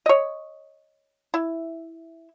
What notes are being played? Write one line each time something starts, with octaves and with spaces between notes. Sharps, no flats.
C#5 D#5
E4